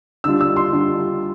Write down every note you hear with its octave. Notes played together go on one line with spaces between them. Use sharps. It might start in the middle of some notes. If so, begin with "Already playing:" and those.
D3 G3 D4 F4 E6
E6
C6
D3 G3 D4 F4